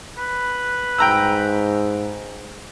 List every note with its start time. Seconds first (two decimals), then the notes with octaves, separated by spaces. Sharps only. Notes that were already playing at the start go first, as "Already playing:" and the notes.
0.18 B4
0.99 G#2 G5 A#5 E6